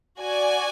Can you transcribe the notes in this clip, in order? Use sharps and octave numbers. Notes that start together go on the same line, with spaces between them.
F#4 D5 G#5